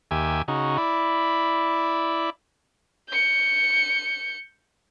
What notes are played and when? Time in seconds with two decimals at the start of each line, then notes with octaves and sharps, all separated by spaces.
0.11 D#2 G4 E5 G#5
0.48 C#3 D#4 F#4
0.78 E4 D5 B5
3.09 G6 C#7